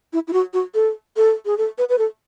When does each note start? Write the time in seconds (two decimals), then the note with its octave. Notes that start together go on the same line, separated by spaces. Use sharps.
0.13 E4
0.28 E4
0.33 F#4
0.53 F#4
0.75 A4
1.17 A4
1.46 G#4
1.58 A4
1.78 B4
1.89 B4
1.98 A4